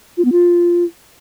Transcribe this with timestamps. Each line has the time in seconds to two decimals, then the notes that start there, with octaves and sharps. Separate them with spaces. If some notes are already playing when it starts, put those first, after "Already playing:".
0.17 F4
0.25 B3
0.32 F4